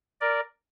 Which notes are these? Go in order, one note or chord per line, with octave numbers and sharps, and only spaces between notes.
A#4 D5